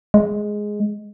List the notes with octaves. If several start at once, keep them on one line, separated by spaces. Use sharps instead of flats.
G#3